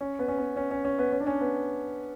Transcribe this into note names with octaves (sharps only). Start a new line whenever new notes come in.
C#4
B3
C#4
B3
C#4
C#4
C#4
B3
C#4
D4
C#4
B3